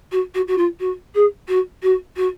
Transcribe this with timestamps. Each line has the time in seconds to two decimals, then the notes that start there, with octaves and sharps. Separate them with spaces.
0.12 F#4
0.34 F#4
0.48 F#4
0.57 F4
0.80 F#4
1.15 G#4
1.48 F#4
1.82 F#4
2.16 F#4